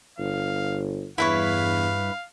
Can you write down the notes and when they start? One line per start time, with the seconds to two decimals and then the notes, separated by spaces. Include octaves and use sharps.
0.18 G1 F5
1.18 E2 G2 E4 B4 C#5 F5